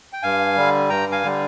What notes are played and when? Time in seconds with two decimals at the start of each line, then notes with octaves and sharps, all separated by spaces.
0.13 G5
0.23 G2 F5 G#5
0.56 D3 G3
0.89 G2 G5 A#5
1.12 F5 G#5
1.23 D3 G3